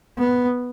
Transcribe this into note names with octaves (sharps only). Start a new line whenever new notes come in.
B3